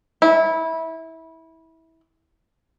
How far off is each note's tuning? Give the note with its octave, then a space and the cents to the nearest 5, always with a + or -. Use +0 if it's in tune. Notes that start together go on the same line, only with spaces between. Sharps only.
E4 -20